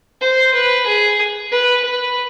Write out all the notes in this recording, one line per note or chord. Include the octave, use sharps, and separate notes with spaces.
C5
B4
G#4
B4
B4